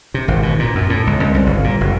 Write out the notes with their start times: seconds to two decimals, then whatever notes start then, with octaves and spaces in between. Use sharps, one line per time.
0.14 C3
0.28 G#1
0.43 B2
0.59 A#2
0.75 F#2
0.90 A2
1.07 C#2
1.20 C#2
1.34 C2
1.47 G1
1.64 A#2
1.81 F#1